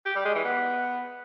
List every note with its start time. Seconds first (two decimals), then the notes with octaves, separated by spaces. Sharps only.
0.06 G4
0.15 G3
0.25 G#3
0.35 E3
0.44 B3